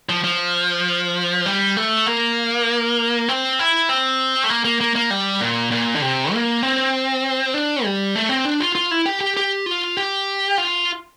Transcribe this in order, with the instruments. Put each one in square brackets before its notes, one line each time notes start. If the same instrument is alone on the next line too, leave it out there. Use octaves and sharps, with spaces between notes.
[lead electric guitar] F3
F3
G3
A3
A#3
C4
E4
C4
A3
A#3
A#3
A#3
A#3
G3
A#2
A#2
D3
C3
A#3
C4
D4
G3
A3
C4
D4
F4
F4
E4
G4
G4
G4
F4
G4
F4